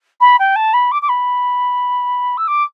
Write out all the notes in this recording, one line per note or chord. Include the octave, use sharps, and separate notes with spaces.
B5
G5
A5
B5
D6
D6
B5
E6
D6